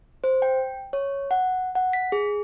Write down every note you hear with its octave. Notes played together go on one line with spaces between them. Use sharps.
C5
G5
C#5
F#5
F#5
B6
G#4